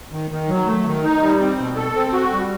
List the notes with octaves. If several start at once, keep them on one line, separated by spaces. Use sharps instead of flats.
D#3
D#3
F#3
A3
D#3
D#4
G3
C4
B2
A4
C4
F#4
G3